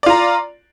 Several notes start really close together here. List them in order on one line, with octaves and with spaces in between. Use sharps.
D5 F4 A#5